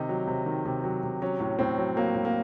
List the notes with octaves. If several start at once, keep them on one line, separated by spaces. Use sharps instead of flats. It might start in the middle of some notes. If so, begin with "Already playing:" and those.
Already playing: C3 D#3 D#4
F#3
C3
D#3
C3
F#3
C3
F#3 C#4
A2
A2 C4
F#3
F#3 A#3
A2
A#3